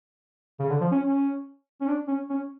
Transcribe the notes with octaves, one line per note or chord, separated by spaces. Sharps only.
C#3
D3
F3
C#4
C#4
C#4
D4
C#4
C#4